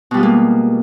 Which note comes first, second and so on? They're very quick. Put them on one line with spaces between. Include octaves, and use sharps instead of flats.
B2 G3 F4 G#3 A#3